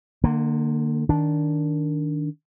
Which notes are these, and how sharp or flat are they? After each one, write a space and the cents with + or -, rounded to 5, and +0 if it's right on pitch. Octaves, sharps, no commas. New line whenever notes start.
D3 +30 A#3 -15
D#3 +0 D4 -10